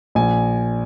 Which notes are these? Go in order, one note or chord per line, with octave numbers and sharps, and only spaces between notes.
A#1 G#5